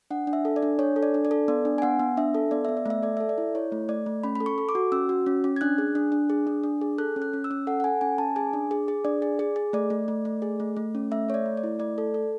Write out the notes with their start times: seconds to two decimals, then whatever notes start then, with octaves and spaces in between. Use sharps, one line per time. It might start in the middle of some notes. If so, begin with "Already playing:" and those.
0.11 D4 F#5
0.27 D4
0.33 E5
0.45 A4
0.56 D5
0.63 D4
0.79 D4 C#5
0.96 A4
1.03 D5
1.14 D4
1.25 D5
1.31 A4
1.48 B3 D5
1.65 D4
1.78 G#5
1.82 B3 F#5
2.00 B3
2.17 D4 E5
2.34 A4
2.51 B3 D5
2.65 B3 E5
2.77 D5
2.86 A3 E5
3.02 A4 D5
3.17 A4 E5
3.29 D5
3.38 E4
3.55 E4 C#5
3.72 A3
3.89 A3 D5
4.06 A3
4.23 C#4 B5
4.35 A4 B5
4.46 C#6
4.58 A4
4.69 D6
4.75 F#4
4.92 C#4 E6
5.09 F#4
5.26 C#4
5.44 C#4
5.56 G#6
5.61 D4 F#6
5.78 G#4
5.95 D4
6.12 D4
6.30 G#4
6.47 D4
6.64 D4
6.81 G#4
6.98 A4 F#6
7.16 C#4
7.22 F#6
7.33 C#4
7.44 E6
7.51 C#4
7.67 A4 F#5
7.80 F#5
7.84 A4 G#5
8.01 C#4 G#5
8.18 C#4 A5
8.36 G#4 G#5
8.53 D4
8.71 G#4
8.88 G#4
9.05 D4 D5
9.22 G#4
9.39 G#4
9.56 G#4
9.73 A3 D5
9.90 A3
10.08 A3
10.25 A3
10.42 G#4
10.60 A3
10.77 A3
10.95 C#4
11.11 A3 E5
11.29 A3 C#5
11.34 D5
11.46 A3
11.57 D5
11.63 E4
11.79 A3 D5
11.98 A4
12.14 A4